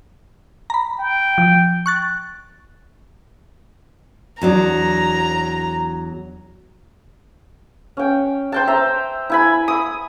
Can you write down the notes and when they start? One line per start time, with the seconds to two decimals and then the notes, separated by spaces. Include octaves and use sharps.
0.70 A#5 B5
0.99 G5
1.38 F3
1.86 C#6 F#6 A6
4.41 E2 F#3 D4 A#5
7.97 C#4 G5
8.52 C5 G5 A5
8.67 E5 A#5
9.30 E4 G#5 B5
9.68 D#6